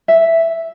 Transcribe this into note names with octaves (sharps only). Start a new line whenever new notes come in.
E5